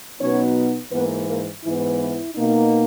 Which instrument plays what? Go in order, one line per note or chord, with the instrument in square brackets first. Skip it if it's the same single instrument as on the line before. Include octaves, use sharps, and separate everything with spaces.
[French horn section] B2 F#3 B3 C#4 D#4 C#5
G#2 E3 A#3 B3 B4
A#3 A#4
G#2 E3 B3 E4
E4
B2 A#3 D#4